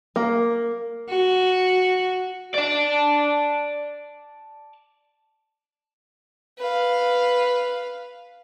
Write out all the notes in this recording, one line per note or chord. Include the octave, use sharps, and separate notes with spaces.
A#3
F#4
D5 A5
B4 F5